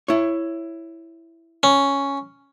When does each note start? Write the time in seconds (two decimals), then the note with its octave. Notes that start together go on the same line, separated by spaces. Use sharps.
0.08 E4 C#5
1.63 C#4